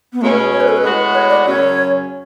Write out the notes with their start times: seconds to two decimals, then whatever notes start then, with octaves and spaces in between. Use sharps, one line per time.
0.13 B3
0.21 B2 G#3 A3 C#4
0.36 G#4
0.52 C#5
0.60 B4
0.68 A4
0.77 B4
0.83 A2 G#3 B3 F#4
1.14 C#5
1.29 D5
1.45 F#2 C#3 F#3 C#4 C#5